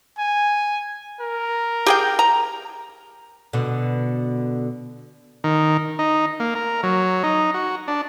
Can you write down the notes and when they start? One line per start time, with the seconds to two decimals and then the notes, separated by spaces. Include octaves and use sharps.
0.18 G#5
1.20 A#4
1.86 G4 G#4 G5
2.19 A#5
3.53 B2 D3
5.44 D#3
5.99 D#4
6.40 A#3
6.55 A#4
6.83 F#3
7.23 D#4
7.54 F#4
7.88 D4